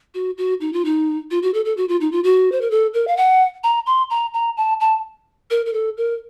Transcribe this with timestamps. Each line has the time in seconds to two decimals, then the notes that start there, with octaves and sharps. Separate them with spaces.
0.14 F#4
0.38 F#4
0.61 D#4
0.73 F4
0.85 D#4
1.31 F4
1.43 F#4
1.54 A4
1.65 A4
1.77 F#4
1.89 F4
2.01 D#4
2.12 F4
2.24 F#4
2.52 C5
2.61 A#4
2.71 A4
2.94 A#4
3.08 F5
3.17 F#5
3.64 A#5
3.87 C6
4.10 A#5
4.34 A#5
4.57 A5
4.80 A5
5.51 A#4
5.66 A#4
5.73 A4
5.98 A#4